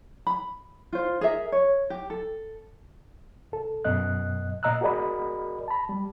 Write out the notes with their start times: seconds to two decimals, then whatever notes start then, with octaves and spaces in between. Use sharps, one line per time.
0.27 B5
0.93 F4 C5
1.21 G#4 A#4 E5
1.52 C#5
1.90 G4
2.10 A4
3.52 C2 A4
3.85 F#2 B2 D#5 F#6
4.63 A#2 D#5 A#5 E6 F#6
4.81 F#4 G#4 A#4 D5 D#5 B5
5.68 A5 B5
5.89 G3